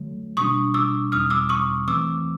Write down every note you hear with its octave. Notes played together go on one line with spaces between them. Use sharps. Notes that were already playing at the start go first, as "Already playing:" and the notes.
Already playing: D3 F#3 A3
B2 G3 A#3 D4 C#6 D#6
D6 E6
E2 B2 G3 C4 D#4 D#6 F6
D6 E6
C#6 D#6
E3 A3 C4 D6 E6